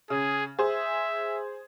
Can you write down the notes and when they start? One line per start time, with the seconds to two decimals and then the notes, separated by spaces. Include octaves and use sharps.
0.10 C#3 G#4
0.59 G#4 C5 E5